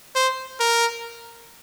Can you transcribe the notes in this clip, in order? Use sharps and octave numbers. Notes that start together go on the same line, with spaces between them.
C5
A#4